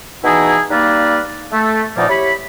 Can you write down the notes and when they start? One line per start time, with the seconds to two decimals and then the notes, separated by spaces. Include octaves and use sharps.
0.24 B2 E3 D#4 E4 G#4
0.71 G3 A#3 D#4 B4 D5 F5
1.53 A3
1.96 E2 A#2 F3 A#3 D#4 D5
2.09 E4 G4 C#5 B5